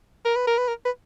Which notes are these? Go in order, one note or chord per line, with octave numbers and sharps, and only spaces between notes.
A#4
B4
A#4
B4
A#4
B4